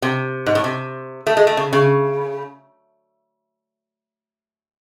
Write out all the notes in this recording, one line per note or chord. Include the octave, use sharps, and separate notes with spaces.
C3
G#2
A2
C3
A3
G#3
A3
C#3
C#3